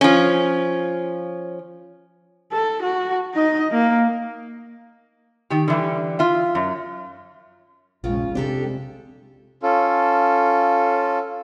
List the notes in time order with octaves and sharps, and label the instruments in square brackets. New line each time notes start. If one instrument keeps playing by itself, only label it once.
[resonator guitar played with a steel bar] F3 C#4
[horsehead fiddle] A4
F#4
D#4 D#5
A#3
[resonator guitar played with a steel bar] D#3 G4
D3 E3 G3
F4 E5
F#2
[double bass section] F1 G#3 C#4 [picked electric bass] A#1 [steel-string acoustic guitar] C#3 F4
[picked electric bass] C3 C4 [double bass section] G3 G#3 [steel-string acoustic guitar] D4 G4 A4
[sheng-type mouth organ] C#4 F4 A4